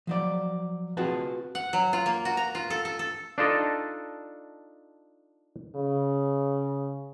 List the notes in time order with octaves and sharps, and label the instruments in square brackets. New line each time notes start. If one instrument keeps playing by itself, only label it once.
[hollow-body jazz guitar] F3 F#3 D5
C4 F4 F#4 G#4 B4 A5
[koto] F#5
F#3
F4
A#3
F#4
A#5
F4
A4
A4
A4
[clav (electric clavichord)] D4 D#4 F4 A4 D#5
[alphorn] C#3